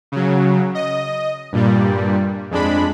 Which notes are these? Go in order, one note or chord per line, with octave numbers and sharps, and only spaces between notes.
C#3 F#3
D#5
G2 A#2 G3
F2 G#3 D4 B5